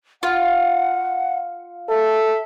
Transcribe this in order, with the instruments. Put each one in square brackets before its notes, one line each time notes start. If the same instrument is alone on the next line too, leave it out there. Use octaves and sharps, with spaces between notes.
[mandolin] F4 [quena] F#5
[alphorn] A4 [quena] E5